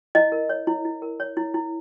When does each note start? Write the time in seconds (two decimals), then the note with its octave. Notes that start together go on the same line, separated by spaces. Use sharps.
0.15 E4 D#5
0.32 A#4
0.49 C#5
0.67 E4
0.85 E4
1.02 A#4
1.20 C#5
1.37 E4
1.54 E4